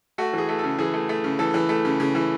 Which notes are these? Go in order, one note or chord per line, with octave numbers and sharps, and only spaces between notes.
A3 F#4
E3 G#4
A3
C#3 A4
E3 G#4
A3
A3
C#3
E3 A4
E3
A3
C#3
C#3
E3